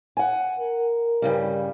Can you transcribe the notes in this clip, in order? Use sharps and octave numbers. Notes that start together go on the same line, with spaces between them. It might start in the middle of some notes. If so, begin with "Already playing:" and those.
F#5 G#5
A#4
G2 C#3 G3